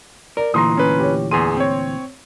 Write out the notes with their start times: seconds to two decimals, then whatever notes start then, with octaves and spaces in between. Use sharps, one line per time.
0.37 A#4 D5
0.54 D2 A#2 E3 A#5 C6 D#6
0.77 C#4 B4
0.99 G4 C#5
1.31 E2 G#4 C6 D#7
1.57 C4 C#5